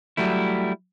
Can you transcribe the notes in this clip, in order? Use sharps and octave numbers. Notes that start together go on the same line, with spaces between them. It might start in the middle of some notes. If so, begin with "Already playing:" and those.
F#3 G3 A3 E4